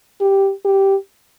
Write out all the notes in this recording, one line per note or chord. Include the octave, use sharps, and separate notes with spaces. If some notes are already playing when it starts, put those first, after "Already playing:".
G4
G4